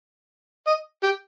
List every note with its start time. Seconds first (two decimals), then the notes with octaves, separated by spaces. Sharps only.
0.67 D#5
1.03 G4